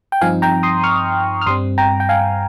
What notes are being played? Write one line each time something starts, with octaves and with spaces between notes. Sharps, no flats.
G5
G2 F3 C4 D#4 F5 G#5
G5 A#5
C6 D#6
C#6 F6
F6
G2 G3 C4 C6 D#6
G5 A#5
G5
F5 G#5